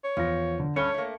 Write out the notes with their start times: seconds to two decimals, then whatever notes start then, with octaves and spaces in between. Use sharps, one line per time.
0.04 C#5
0.17 E2 F3 F4 A#6
0.60 D3
0.76 G2 C#4 A4 C#5 C#7 G7
0.94 A3 A#3